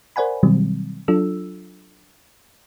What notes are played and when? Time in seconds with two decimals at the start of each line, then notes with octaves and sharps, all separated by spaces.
0.16 A#4 C5 D5 F#5 G#5 B5
0.43 B2 D#3 F#3 G3 C4
1.08 F#3 D4 F4 A4 E6